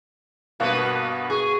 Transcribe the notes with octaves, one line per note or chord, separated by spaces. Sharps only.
G2 B2 A#3 F#4 B4
G#4 C#6